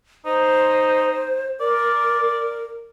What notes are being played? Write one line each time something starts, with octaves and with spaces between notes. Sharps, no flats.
D#4 C5
A#4 D5